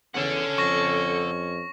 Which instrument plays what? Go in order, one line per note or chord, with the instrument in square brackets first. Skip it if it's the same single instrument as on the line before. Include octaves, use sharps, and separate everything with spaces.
[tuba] E2 [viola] C#4 [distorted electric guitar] A4 F#5
[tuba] F2 [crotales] C#6 A#6